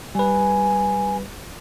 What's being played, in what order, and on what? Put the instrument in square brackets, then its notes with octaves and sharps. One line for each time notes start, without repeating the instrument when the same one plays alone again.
[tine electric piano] G3 B4 [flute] G#5